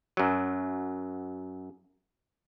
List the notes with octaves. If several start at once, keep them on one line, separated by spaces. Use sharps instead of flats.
F#2 F#3